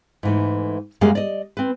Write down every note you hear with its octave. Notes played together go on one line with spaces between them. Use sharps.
G#2 E3 A3
F#2 G3 G#3 A#3 G#4 F5
D5 D#5
C4 B4